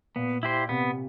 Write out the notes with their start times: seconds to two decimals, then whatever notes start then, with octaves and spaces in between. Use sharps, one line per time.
0.16 A#2 B3
0.43 E4 G4 C5
0.69 C3 B3